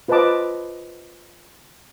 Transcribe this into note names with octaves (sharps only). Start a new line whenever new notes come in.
F4 B4 C5 D#5 A5 D6